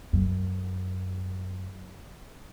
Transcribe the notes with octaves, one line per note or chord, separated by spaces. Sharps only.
F#2